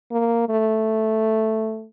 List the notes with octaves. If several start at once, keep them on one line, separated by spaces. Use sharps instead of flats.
A#3
A3